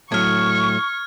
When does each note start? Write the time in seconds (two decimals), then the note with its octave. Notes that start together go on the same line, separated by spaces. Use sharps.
0.12 A2 F#3 C#6 F6 G#6